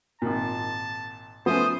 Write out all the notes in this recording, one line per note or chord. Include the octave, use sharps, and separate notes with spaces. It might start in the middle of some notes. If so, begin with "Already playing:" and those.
G#1 A#2 A5
F3 A3 B3 C#4 C5 D#6